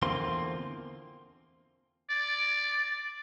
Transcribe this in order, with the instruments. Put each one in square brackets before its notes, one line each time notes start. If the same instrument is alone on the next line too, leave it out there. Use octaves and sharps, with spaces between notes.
[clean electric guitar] E2 D3 A#3 C4 F4 C6
[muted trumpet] D5